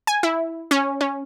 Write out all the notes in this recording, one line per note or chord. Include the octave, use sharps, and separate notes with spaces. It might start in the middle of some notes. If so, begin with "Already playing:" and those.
G#5
E4
C#4
C#4